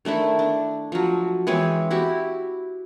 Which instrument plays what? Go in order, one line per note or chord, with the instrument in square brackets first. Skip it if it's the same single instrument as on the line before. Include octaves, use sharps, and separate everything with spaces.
[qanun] D#3 A3 D4 E4
D4
F3 F#3
E3 G#3 C4 C#5
E4 F#4 G4